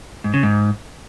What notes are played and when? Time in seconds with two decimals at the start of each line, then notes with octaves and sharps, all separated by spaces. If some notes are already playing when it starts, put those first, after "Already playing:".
0.24 G#2
0.34 C#3
0.43 G#2